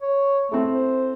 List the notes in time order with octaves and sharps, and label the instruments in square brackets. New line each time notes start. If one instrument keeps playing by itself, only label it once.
[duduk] C#5
[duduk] A3 [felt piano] C4 E4 A4
[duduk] C5